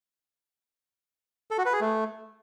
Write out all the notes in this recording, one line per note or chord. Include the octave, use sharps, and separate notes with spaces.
A4
F#4
B4
G#4
A3